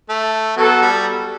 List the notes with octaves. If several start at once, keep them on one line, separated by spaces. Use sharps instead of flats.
A3
F#3 B3 F#4 A4
G3